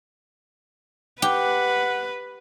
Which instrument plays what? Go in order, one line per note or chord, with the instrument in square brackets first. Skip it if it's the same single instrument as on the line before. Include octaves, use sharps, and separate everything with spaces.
[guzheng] G4 [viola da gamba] B4 [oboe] F#5